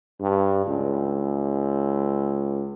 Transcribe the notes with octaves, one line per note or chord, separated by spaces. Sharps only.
G2
C#2